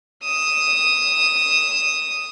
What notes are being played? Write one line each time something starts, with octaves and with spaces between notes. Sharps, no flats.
D#6 E7